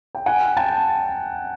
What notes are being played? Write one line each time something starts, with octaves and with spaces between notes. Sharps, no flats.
G5
F#5 G#5
G5 A5